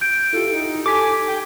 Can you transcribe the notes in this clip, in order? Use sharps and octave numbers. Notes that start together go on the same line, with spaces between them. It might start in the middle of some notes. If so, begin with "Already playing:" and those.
G6 D7
E4 F4 G4 A4
D#4
G4 A4 G#5 D6 B6
G5